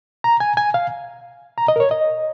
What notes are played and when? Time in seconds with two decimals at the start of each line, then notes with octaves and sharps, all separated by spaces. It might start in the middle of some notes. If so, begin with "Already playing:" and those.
0.24 A#5
0.40 G#5
0.57 G#5
0.74 F5
1.58 A#5
1.68 D#5
1.76 A#4
1.80 C#5
1.91 D#5